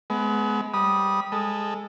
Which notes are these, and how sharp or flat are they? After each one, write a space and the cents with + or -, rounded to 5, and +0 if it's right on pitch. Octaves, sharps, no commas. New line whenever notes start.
G#3 +35 B3 +10
G3 -5 B5 -20 D#6 +0
G#3 -15 A4 +0